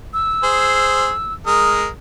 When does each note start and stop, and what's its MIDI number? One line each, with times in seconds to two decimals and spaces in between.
0.13 1.34 88
0.44 1.11 68
0.44 1.11 72
1.47 1.87 56
1.47 1.87 70
1.47 1.87 87